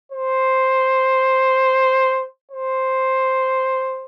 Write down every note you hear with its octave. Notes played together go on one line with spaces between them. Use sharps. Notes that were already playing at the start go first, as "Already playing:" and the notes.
C5
C5